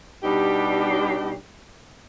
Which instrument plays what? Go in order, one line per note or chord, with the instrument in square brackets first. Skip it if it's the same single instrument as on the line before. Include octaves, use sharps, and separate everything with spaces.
[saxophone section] B2 G3 D4 D#4 G4